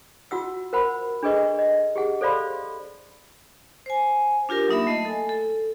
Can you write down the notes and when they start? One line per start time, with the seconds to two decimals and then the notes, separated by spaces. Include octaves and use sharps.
0.31 F4 F#4 F#5 E6
0.73 A#4 C5 F#5 B5
1.23 D4 G#4 A4 B4 D#5 C#6
1.59 D#5
1.96 G4 G#4 F#5
2.21 A4 C5 D5 F5 B5 C6
3.86 C5 G#5
4.49 D4 F4 G4 A#4
4.68 F#3 A#3 D#4 E5 B5
4.87 A3 D#5 A5
5.05 A4 G#5
5.29 A4